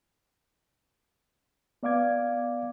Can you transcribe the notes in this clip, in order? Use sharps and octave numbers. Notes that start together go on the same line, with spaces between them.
B3 D5 F5 D6 G#6